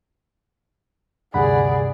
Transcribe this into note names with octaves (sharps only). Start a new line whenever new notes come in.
D2 G2 C3 D#3 G#4 D5 F#5 B5